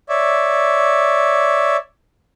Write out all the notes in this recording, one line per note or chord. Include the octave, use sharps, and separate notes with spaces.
C#5 D5 E5